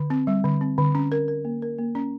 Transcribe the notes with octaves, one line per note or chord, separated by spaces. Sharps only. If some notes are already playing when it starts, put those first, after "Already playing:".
Already playing: D3
C4
G3
D3
C4
D3
C#4
A#4
A#4
A#3
A#4
A#3
C#4